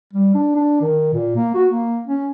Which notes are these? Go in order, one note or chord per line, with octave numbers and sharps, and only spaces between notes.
G3
D4
D4
D#3
A#2
A#3
F#4
A#3
C#4